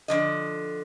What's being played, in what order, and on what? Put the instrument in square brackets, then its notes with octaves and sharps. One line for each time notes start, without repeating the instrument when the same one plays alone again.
[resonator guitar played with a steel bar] D3 F3 D#5